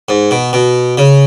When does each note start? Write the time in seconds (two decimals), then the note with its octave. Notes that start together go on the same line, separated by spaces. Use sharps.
0.09 G#2
0.31 B2
0.53 B2
0.98 C#3